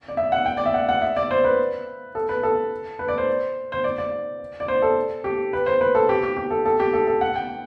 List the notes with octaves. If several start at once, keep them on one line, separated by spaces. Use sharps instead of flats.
D5
E5
F#5
G5
D5
E5
F#5
F#5
E5
D5
C5
B4
A4
B4
A4
B4
D5
C5
C5
D5
D5
D5
C5
A4
G4
B4
C5
B4
A4
G4
G4
G4
A4
A4
G4
A4
A4
F#5
G5